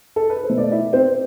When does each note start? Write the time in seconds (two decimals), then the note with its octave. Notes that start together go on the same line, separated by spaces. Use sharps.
0.16 A4
0.30 B4
0.43 C5
0.50 B2 A3
0.58 D5
0.71 E4 E5
0.93 C4 C5